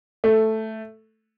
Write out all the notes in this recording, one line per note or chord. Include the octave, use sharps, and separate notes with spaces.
A3